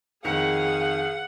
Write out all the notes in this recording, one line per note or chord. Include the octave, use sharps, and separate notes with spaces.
F2 D#3 G#4 F5 F#5 C#7